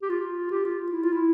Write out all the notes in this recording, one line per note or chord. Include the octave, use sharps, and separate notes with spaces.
G4
F4
G4
F4
E4
F4
E4